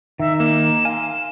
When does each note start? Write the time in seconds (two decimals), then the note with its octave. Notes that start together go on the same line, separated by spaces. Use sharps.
0.19 D#3 D#4 E5
0.40 A#3 E7
0.85 F5 G#5 C6